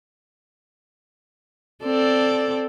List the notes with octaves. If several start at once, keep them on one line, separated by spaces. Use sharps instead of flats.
C4 A4 D5